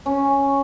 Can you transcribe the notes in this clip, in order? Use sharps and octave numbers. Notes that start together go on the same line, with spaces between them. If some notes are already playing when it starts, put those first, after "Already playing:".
C#4